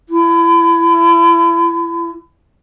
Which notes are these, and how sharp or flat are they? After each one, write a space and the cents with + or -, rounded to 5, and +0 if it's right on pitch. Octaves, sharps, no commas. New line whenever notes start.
E4 +35